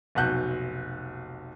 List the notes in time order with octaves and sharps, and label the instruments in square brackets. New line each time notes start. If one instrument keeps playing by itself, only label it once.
[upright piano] F1 B1 F#4 F#6 G6